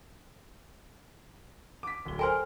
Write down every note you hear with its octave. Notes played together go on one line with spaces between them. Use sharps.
D6 B6
D1 G7
A4 A#4 C5 G5 G#5 A#5 C6 F6